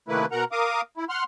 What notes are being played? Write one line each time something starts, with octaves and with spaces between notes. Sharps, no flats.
C3 D#3 A3 A#3 E4 B4
B2 A#4 F#5 A#5
A#4 F5 D6 D#6
E4
F#5 C6 F6